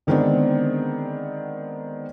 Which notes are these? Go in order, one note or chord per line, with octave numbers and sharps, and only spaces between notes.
D3 D#3 G#3 B3 C4 D4